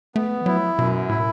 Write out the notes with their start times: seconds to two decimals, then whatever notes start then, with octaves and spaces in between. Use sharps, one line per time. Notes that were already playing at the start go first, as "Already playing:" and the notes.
0.15 A3 B3
0.41 E3
0.46 F#3 E4
0.78 F#2 B2
1.09 A2 E4